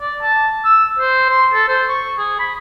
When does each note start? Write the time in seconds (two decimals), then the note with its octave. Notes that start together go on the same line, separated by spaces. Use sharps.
0.01 D5
0.22 A5
0.64 E6
0.99 C5
1.29 C6
1.53 A4
1.68 C5
1.89 C#6
2.18 G#4
2.39 B5